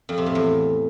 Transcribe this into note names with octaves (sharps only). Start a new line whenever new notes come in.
F2
C3
A2
E2